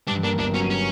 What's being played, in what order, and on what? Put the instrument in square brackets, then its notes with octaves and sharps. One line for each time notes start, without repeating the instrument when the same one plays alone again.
[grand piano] G2 [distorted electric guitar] D4
[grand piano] A#3 [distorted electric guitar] D4
[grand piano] G1 [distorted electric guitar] D4
[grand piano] F#3 [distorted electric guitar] C#4
[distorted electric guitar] C#4